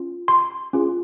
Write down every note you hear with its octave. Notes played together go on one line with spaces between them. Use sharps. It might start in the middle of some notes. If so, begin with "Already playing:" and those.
Already playing: C#4 F4
C6
C#4 F4 G#4